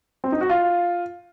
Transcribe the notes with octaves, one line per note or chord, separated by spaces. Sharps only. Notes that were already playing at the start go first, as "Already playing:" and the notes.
C4
D#4
F#4
F4